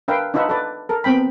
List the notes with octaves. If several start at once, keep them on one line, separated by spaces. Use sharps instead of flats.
D4 A#4 B4 E5 F5 G5
D4 D#4 F4 B4 E5 F#5
A4 B4 D5
A4 A#4
B3 C4 G5 B5